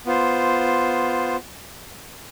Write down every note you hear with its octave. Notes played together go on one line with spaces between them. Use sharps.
B3 F4 C5